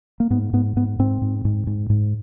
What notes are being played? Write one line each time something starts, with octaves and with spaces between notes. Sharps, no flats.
A#3
G#2 B3
G#2 B3
G#2 B3
G#2 C4
G#2
G#2
G#2
G#2